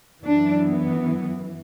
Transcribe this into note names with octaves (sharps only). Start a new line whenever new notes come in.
F#2 E3 D4
B3